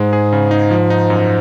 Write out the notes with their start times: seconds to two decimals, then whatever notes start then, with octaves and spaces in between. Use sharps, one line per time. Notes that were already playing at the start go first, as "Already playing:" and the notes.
Already playing: G#2 G#3
0.13 G#4
0.32 C#3
0.51 D#4
0.71 F3
0.90 D#4
1.10 F#2